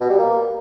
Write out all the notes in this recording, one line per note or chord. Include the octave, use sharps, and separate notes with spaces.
B2
G3
A#3